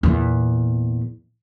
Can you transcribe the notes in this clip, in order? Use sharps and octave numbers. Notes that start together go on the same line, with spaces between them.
E2 A#2